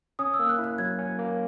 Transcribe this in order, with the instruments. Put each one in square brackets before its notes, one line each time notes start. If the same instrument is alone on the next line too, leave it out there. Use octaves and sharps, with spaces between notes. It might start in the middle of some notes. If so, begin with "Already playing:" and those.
[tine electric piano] C#4 [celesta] D#6
[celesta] E6
[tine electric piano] A#3
[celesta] F#6
[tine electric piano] E4
[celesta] F#6
[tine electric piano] F#3 [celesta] G#6
[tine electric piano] C#4
A#3